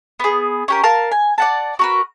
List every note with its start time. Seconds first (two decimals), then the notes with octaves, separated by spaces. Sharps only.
0.20 B3 G#4
0.68 C#4 G4 A#4
0.83 A#4 F5 A5
1.11 G#5
1.38 D5 F#5 A5
1.79 F#4 A#4 B4